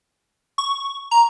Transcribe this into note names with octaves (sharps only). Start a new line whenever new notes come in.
C#6
A#5